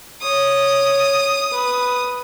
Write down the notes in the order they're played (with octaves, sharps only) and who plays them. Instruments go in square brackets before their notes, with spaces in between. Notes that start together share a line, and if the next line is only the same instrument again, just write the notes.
[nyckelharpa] C#5 [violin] D#6
[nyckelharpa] B4